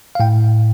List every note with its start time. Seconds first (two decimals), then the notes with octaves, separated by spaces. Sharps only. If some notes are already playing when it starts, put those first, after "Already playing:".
0.15 F5
0.20 A2 G5